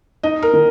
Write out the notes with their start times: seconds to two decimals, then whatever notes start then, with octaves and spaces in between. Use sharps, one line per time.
0.23 D#4 D#5
0.42 A#4
0.53 D#3